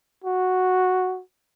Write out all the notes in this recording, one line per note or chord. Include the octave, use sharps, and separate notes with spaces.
F#4